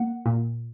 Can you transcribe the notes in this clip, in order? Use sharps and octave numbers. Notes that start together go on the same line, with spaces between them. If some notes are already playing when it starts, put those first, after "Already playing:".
Already playing: A#3 F#5
A#2